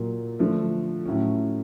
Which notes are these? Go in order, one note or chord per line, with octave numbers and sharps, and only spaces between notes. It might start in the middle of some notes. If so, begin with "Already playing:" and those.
Already playing: A#2 F#3 A#3
D3 F3 A3
A2 F#3 A3 C#4